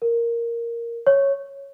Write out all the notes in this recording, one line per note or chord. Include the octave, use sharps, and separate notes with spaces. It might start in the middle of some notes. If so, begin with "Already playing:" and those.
A#4
C#5